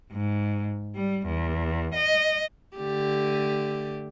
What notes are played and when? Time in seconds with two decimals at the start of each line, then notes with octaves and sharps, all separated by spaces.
0.12 G#2
0.95 G3
1.26 E2
1.94 D#5
2.76 D3 A3 G4